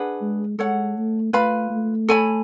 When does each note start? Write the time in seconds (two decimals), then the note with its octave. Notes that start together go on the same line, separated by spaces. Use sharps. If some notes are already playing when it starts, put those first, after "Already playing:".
Already playing: D4 G#4 B4 F#5
0.21 G#3
0.58 G#3 A4 C#5 F#5
0.96 A3
1.33 A3 F4 B4 F5 B5
1.70 A3
2.09 A4 C#5 G#5 B5